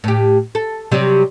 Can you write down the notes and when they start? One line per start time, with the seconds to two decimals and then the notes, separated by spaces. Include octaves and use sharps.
0.04 A2 G4
0.55 A4
0.92 C3 F#3 G3